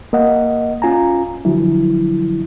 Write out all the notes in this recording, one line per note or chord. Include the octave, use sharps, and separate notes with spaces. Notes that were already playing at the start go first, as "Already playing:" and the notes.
A#3 D#5 F#5
C#4 F4 G#5 A#5
D3 F3 F#3 E4